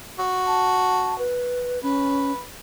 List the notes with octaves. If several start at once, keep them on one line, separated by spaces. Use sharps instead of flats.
F#4
A5
B4
C#4 B4